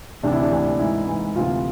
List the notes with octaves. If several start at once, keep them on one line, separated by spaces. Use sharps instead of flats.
D2 C3 E3 D4
E4
D4
D2 C3 E3
G#2 E3 E4
G#2 E3
D2 C3 E3 F4